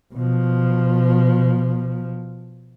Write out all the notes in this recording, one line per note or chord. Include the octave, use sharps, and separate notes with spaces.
B2 F3